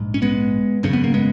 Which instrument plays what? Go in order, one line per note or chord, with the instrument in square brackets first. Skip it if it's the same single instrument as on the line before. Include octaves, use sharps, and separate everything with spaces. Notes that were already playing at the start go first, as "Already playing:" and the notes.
Already playing: [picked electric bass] A#1 G#2
C#4
G#3 B3
G#1 F#2 C#3 C#4
B3
A#3
G#3 B3